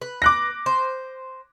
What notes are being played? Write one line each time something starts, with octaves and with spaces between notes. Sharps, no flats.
B4
D6 F#6 A#6
C5